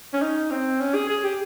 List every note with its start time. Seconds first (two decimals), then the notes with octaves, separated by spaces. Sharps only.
0.13 C#4
0.22 D#4
0.51 C4
0.80 C#4
0.94 G#4
1.09 G#4
1.24 G4